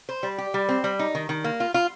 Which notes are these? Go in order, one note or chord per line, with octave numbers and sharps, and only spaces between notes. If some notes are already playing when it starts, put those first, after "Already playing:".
C5
G3
G4
G3
C4
G3
D#4
D#3
D#3
A#3
F4
F4